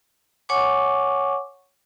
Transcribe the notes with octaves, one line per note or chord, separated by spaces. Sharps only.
C#5 F#5 G#5 C#6 D6